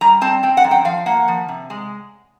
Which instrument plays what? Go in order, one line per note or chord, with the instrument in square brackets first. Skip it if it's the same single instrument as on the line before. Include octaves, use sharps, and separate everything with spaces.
[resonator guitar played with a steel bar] G3 A#5
C4 A5
C4 G5
F#5
F#2
G5
F3 F5
A#3 F#5
F3
C3
G#3